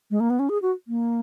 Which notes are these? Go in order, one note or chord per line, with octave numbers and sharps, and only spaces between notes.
G#3
A#3
B3
C#4
G#4
F#4
A#3